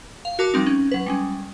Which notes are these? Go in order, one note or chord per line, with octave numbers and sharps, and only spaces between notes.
F5
F#4 A#4 A5 D6
F3 G3 C4 D#4
C#4
F#3 B4
G3 G#3 C#4